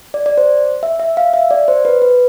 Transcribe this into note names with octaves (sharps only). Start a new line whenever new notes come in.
D5
D5
C5
E5
E5
F5
E5
D5
C5
B4
B4